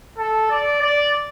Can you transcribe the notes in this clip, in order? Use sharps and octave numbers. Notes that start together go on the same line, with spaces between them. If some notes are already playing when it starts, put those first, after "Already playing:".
A4
D5
D5